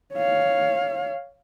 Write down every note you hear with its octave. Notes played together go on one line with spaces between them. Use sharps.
C#5 F5